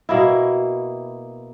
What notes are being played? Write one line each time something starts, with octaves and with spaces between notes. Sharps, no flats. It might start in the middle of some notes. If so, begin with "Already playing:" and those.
B2 A#3 E4